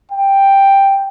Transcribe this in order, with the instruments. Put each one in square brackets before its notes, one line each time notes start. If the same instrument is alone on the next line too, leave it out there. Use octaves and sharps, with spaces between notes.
[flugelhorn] G5